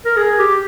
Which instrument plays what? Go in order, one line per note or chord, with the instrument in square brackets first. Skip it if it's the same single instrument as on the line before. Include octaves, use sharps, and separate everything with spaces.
[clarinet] A#4
G#4
G4